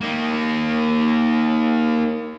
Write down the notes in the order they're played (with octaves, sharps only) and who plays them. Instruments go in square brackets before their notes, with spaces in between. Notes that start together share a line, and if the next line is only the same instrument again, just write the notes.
[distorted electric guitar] A#3 D#4